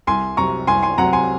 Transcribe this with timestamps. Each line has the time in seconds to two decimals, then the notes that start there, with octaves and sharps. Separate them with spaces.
0.07 C2 G#5 C6
0.37 C3 F#3 A#5 C#6
0.67 C2 G#5 C6
0.83 G#5 C6
0.98 C3 F#3 F#5 A#5
1.13 G#5 C6